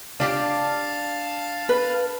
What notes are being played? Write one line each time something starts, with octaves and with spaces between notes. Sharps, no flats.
D4 G4 F5 A5
B4